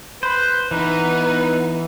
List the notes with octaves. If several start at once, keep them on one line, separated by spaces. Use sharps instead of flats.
B4 C5
E3 B3 D#4 B4